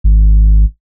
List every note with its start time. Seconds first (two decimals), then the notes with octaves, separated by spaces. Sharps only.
0.04 G#1